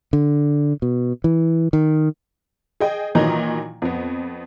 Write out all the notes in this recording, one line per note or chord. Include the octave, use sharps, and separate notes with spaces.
D3
B2
E3
D#3
G#4 D#5 G5
A#2 D#3 E3 F#3 D#5 A#5
F2 B3